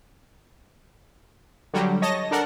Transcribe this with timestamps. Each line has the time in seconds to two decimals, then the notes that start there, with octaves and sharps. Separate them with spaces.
1.74 D3 F#3 G3
2.02 C#5 D#5 A5 A#6
2.31 D4 A4 A#4 F#5